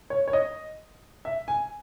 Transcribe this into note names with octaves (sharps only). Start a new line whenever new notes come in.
C#5
C#5
D#5
E5
G#5